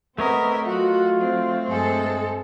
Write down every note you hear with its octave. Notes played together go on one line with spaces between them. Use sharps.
A3 B3 C4 A#4 C#5 D#5 E5
F#3 F4 F#4
C4
G2 G#3 A4